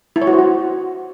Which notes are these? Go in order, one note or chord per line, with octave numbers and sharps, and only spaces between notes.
E4
C#5
F#4
C5
F#4